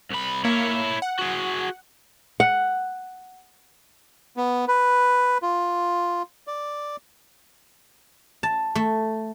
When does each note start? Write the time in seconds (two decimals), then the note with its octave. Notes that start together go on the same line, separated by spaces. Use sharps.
0.11 C2 B5
0.45 A#3 E4 C#5
1.02 F#5
1.19 F#4 G#4
2.40 F#5
4.37 B3
4.68 B4
5.42 F4
6.47 D5
8.43 A5
8.75 A3